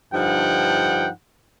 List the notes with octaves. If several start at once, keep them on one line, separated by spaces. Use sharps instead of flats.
G2 D3 F3 D#4 F#5 G5